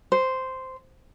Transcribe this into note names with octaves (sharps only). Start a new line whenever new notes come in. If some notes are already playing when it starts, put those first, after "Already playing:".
C5